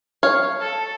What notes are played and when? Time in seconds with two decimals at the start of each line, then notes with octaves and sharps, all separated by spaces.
0.23 C#5 F5
0.60 A4